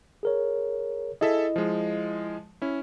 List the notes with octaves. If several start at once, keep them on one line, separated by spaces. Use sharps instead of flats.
G#4 A#4 C#5
E4 G#4 A4 D#5 E5
F3 G#3
C#4 E4